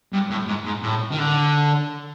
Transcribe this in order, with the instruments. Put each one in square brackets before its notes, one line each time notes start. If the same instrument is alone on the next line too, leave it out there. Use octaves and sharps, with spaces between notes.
[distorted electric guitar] G2
A2
G#2
G#2
A2
D#3
D3